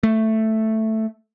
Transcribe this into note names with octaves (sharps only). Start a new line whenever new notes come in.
A3